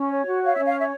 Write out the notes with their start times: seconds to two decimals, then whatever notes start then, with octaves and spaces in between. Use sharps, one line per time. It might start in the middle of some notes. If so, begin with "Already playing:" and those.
Already playing: C#4
0.10 C#5
0.26 F#4
0.42 C#5 F5
0.55 E5
0.58 C#4
0.66 F5
0.75 C#5 E5